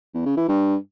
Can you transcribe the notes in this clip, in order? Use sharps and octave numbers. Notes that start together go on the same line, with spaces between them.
E2
C#3
E3
G2